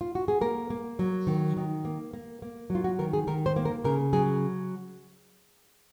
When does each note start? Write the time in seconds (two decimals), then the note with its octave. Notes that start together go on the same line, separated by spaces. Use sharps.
0.01 F4
0.15 F#4
0.28 G#4
0.41 A#3 A#4
0.70 A#3
0.99 F#3
1.27 D#3
1.57 D#3
1.85 A#3
2.13 A#3
2.42 A#3
2.70 F#3
2.75 F4
2.84 F#4
2.99 D#3 A#4
3.13 G#4
3.27 D#3 A#4
3.46 C5
3.56 A#3
3.65 A#4
3.84 C#3 A#4
4.13 F#3 G#4